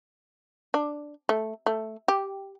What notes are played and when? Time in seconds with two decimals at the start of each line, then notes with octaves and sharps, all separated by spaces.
0.74 D4
1.29 A3
1.66 A3
2.08 G4